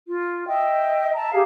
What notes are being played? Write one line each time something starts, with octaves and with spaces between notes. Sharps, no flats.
F4
D#5 E5 G5
E5 A5 A#5
G4 G#4 E5 F5